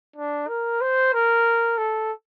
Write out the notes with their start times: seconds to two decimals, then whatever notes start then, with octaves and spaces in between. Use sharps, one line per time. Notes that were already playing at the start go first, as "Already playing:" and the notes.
0.16 D4
0.48 A#4
0.81 C5
1.14 A#4
1.78 A4